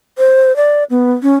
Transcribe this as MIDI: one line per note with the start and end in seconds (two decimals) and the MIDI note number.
0.18 0.55 72
0.56 0.84 74
0.90 1.12 59
1.23 1.35 61